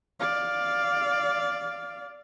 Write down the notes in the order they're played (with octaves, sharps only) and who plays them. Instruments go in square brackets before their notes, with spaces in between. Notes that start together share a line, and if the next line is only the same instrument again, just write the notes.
[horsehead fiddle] D5 F5